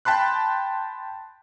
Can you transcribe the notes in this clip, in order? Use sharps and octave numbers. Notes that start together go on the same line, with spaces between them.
G5 A5 B5 C6 F#6